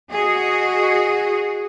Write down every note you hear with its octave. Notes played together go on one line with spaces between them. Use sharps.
F#4 G#4 D#5